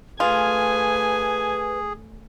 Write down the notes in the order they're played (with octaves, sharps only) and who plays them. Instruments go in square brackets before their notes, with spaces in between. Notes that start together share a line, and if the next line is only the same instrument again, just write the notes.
[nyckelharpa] A3 G#5 [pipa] F4 [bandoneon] G#4 [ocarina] B4